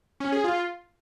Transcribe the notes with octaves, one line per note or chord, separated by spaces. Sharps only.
C#4
G#4
F4